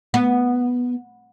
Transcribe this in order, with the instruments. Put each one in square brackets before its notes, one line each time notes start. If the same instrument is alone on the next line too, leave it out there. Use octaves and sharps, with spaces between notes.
[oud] B3